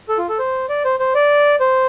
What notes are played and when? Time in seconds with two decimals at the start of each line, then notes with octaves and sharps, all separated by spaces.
0.09 A4
0.18 F4
0.29 A4
0.39 C5
0.69 D5
0.85 C5
1.00 C5
1.15 D5
1.60 C5